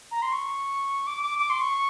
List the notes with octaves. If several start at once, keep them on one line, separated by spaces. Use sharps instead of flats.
A#5
C6
C#6
D6
D6
D6
C6
C#6